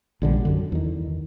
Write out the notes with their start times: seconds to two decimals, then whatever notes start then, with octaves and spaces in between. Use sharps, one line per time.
0.22 A#1 D3 D#3 G3
0.45 F#2 D3
0.72 E2 D#3